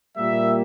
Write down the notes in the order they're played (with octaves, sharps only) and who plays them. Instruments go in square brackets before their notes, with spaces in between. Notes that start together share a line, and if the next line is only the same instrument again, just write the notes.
[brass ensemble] A#2 G3 A#3 E5